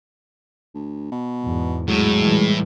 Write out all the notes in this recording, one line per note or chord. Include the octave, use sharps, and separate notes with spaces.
D2
B2
E2 G#2
A2 F#3 G#3
A#2 E3 G3